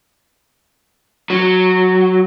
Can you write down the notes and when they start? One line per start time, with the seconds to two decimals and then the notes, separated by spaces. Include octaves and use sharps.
1.30 F#3